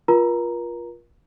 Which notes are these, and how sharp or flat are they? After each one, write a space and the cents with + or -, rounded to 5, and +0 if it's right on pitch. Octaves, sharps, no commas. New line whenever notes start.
F4 +0 A#4 +40 A#5 +0